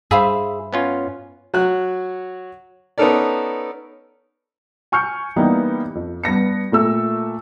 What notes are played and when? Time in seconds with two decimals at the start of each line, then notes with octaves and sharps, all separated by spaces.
0.11 G2 G#4 C5 E5 F5 B5
0.73 B3 C#4 F4
1.54 F#3 F#4 F#6
2.98 B3 C#4 D#4 A4 A#4 D5
4.92 G#5 C#6 F6 G6 C#7
5.36 E3 G3 A#3 B3 D#4
5.95 F2
6.24 G2 B3 A#6 C#7
6.72 A#2 A3 E6